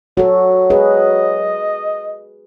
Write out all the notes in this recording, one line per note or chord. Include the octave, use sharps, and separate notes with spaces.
F#3 F#4 A4
G#4 B4 D#5